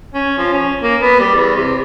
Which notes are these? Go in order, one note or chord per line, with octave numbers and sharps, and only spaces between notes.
C#4
F3
C#4
A#3
B3
G3
E2
C3